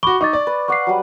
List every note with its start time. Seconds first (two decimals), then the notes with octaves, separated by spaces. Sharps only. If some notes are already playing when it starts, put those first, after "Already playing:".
0.03 F#4 B5 C#6 D6 G7
0.21 D#4 C#6 D6 A6
0.33 D5
0.47 B4
0.68 F5 F#5 C#6 D6 C7
0.87 F#3 G3